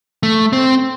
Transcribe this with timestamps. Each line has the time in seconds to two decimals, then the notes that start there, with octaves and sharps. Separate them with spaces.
0.23 A3
0.53 C4